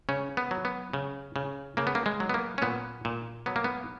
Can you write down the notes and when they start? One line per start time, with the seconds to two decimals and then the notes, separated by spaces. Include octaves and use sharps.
0.09 C#3 C#4
0.37 B3
0.51 F#3
0.65 B3
0.93 C#3
1.36 C#3
1.77 C#3 A#3
1.87 B3
1.95 A#3
2.06 G#3
2.20 F#3
2.30 B3
2.34 A#3
2.58 C#4
2.62 A#2 B3
3.05 A#2
3.46 F#3 B3
3.56 A#3
3.64 B3